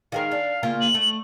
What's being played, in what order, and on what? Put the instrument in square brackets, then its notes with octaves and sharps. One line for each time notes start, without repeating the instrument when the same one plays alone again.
[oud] D#3 G#3 A#4 [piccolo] F5
[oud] D4
C#3 A#3 F4
[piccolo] F#7
[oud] A3